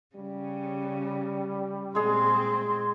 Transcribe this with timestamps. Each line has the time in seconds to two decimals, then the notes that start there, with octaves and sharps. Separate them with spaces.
0.15 C#3 G3
1.95 A#2 G#3 C4 G#4 C6